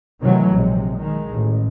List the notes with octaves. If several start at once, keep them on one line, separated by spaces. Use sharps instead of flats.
C3 D#3 E3 F#3 A3
A#1 C3 G#3
D#3 G#3
A1